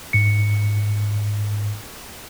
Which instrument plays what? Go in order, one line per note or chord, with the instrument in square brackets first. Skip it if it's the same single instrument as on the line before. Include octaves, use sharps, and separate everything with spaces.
[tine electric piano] G#2 C#7